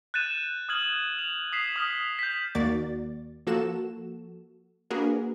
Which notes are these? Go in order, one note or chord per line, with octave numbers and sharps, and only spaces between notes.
F#6 G6 A6 D#7 E7
D#6 F6 G#6 F#7
F7
D#6 B6 C7 E7
D#6 F6 B6
G6 B6
D#2 D#3 A#3 F#4 D5 A6
F3 A#3 F#4 A4 E7
A#3 D4 F#4 G#4 A#4 B4